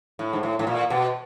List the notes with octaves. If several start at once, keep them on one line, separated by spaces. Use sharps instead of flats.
A2
G#2
A2
A2
A#2
B2